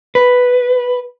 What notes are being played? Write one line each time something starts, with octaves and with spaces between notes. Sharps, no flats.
B4